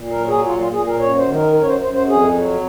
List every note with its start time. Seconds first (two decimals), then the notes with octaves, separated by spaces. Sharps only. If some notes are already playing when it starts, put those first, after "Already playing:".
Already playing: A#2
0.10 A#4
0.18 F#3
0.28 G#4
0.46 A#2 F4
0.59 F4
0.72 A#2 G#4
0.87 A#4
0.99 F#2 C#5
1.17 C5
1.26 D#3
1.35 A#4
1.53 F#2 A#4
1.62 C#5
1.67 C5
1.81 F#2 C5
1.93 C5
2.07 F2 G#4
2.34 F#3